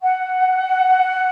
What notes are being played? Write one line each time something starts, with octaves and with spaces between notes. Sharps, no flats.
F#5